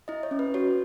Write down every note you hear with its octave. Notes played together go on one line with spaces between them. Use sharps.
E4 D#5
C#5
C#4
B4
F#4 C#5